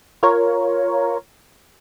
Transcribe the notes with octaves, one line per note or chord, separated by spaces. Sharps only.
F4 A#4 C#5